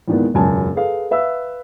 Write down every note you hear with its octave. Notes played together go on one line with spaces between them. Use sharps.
E2 A#2 D#3 G#3 B3
E1 C#2 F#2 G#5 A5
G#4 A4 B4 F5
B4 E5 F5 E6